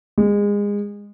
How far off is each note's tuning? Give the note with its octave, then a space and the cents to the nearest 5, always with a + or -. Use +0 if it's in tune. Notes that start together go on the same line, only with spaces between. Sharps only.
G#3 -25